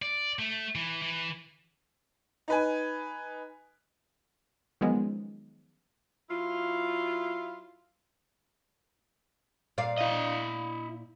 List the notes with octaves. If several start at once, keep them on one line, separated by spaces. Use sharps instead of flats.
D5
A3
E3
E3
D#4 B4 G#5
D#3 F3 F#3 G#3 B3 C#4
F#3 E4 F4
A#2 D5 F5
E4 D#5